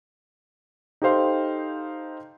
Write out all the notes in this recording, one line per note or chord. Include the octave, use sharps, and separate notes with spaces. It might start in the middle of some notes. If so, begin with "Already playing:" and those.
D#4 G4 A4 C5 F5 C6